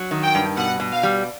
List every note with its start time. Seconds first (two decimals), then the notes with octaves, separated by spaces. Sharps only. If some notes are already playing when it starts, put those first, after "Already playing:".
Already playing: F#3
0.11 D#3
0.23 G5
0.35 G2
0.57 B2 F#5
0.80 B2
0.92 F5
1.03 G3